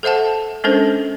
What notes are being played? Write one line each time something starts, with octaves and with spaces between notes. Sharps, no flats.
A4 C5 E5 F#5 A5
G#3 C#4 D4 A4 A#4 C5